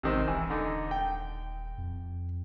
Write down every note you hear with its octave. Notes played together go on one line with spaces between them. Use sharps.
A1 C3 D#3 C4
D#1 E3
D3 D#4
G5
F2